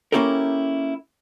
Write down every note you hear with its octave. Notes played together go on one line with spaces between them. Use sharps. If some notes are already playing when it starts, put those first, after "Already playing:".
A#3 C#4 E4 G4 A4 A#4